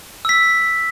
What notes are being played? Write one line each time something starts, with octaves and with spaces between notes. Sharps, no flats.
E6 B6